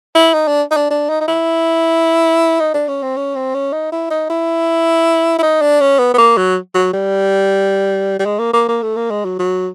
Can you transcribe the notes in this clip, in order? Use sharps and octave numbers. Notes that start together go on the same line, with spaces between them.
E4
D#4
D4
D#4
D4
D4
D#4
D#4
E4
D#4
D4
C#4
C4
C#4
C4
C#4
D#4
E4
D#4
E4
E4
D#4
D4
C#4
B3
B3
A#3
F#3
F#3
G3
G3
G#3
A#3
A#3
A#3
A3
A#3
G#3
F#3
F#3